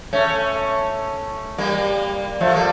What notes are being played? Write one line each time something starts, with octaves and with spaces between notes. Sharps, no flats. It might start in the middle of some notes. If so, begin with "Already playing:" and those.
A3 C#4
G3 A#3
F3 A3
G3 A#3